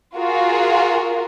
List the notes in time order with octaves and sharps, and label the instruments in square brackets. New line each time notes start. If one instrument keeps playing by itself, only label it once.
[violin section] F4 F#4 G#4 A#4